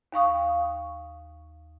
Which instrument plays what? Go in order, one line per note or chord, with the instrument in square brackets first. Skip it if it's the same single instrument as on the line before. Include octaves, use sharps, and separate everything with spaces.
[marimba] D#2 F5 C#6 D#6